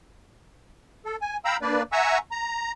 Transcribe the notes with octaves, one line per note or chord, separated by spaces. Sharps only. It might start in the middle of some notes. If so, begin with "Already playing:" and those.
A4
G#5
F5 G5 A#5 B5 E6
A#3 D4 B4 D5
E5 F#5 G#5 A#5 C#6 E6
A#5